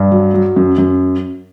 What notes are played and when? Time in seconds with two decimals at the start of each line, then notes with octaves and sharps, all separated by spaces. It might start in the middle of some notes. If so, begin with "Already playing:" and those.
Already playing: G2
0.12 F#3
0.34 F#3
0.56 F#2
0.78 F#2